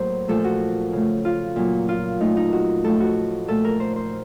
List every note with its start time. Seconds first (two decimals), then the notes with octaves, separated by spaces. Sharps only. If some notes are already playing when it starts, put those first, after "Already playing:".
Already playing: A2 F#3 A#3 C5
0.28 A#2 F3 A3 A4
0.44 F#4
0.92 C#3 A3
1.25 F4
1.56 A#2 F#3 A#3
1.89 F4
2.20 A#2 A3 D#4
2.37 D#4
2.53 F#4
2.84 A2 F3 A3 A4
3.00 F#4
3.48 A#2 A3 A4
3.65 A#4
3.80 C5
3.96 C5